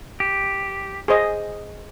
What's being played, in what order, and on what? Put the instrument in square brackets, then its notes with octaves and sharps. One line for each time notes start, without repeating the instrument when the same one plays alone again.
[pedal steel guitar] G4
[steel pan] G#4 C5 D#5